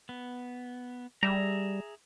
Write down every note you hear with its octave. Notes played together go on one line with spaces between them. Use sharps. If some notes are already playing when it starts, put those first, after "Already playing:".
B3
G3 G#4 E5 A#5